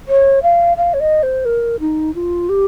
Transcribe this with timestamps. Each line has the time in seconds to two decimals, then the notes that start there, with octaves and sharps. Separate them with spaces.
0.08 C#5
0.43 F5
0.77 F5
0.94 C#5
1.00 D#5
1.23 C5
1.45 A#4
1.80 D#4
2.15 F4
2.49 G4